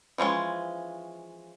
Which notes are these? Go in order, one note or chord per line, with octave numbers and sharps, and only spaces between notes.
E3 F3 G#3 C#4